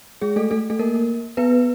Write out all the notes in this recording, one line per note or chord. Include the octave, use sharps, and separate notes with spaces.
G#3 G#4
A3 A4
A3 A4
A3 A4
A#3 A#4
B3 B4